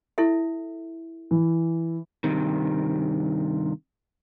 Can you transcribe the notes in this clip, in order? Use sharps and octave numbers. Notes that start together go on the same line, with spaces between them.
E4 A4 E5
E3
G2 C3 D#3